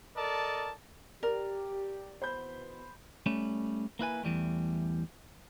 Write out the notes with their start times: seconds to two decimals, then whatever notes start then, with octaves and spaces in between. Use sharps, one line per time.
0.16 A4 A#4 D5 D#5 A5
1.23 G4 A#4 D5
2.22 B2 E3 B3 C5 B5 G6
3.26 G3 A3 C#4
3.99 A#3 E4 B4 G#5
4.23 E2 E3 G3 A3